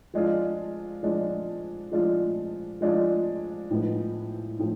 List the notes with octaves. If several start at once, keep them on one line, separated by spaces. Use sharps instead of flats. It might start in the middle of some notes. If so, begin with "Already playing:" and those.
F3 G#3 D4 F4
F3 G#3 D4 F4
F3 G#3 D4 F4
F3 G#3 D4 F4
A2 F3 G#3 B3
A2 F3